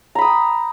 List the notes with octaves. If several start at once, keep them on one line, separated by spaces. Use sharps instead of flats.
G5 A#5 B5 D#6